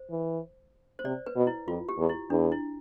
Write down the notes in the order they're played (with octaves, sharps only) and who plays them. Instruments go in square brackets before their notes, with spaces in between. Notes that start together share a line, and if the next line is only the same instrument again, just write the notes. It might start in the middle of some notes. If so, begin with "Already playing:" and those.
Already playing: [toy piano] C5
[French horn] E3
[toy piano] C5
[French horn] C3 [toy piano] D5
[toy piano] B4
[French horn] B2
[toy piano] E4
[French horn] F2 [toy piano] F4
[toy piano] G4
[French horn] E2
[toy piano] E4
[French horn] E2 [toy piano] D4
[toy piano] E4